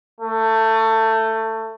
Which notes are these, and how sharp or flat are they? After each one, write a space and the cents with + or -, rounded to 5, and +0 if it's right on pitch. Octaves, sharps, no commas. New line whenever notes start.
A3 +20